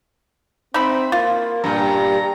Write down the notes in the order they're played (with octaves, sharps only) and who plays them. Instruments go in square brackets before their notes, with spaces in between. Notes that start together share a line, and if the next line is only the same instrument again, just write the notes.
[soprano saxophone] C4 [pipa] D#4 E5 B5
[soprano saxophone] A#3 [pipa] F4
[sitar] G2 A#2 [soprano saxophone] A#5